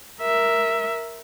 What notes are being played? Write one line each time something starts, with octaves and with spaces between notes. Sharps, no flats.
A#4 E5